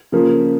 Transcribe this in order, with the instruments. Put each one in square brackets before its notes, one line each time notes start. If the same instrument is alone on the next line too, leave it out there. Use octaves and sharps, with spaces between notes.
[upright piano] C#3 F3 A#3